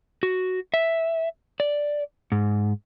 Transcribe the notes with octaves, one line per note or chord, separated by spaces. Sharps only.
F#4
E5
D5
G#2